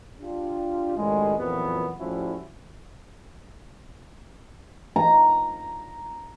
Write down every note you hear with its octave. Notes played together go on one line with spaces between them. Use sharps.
D4 F4 G4
F#2 A2 D#3 G3 G#3
F2 A#2 E3 F#3 B3
A2 F3 G3 C#4 E4 F#4
A#5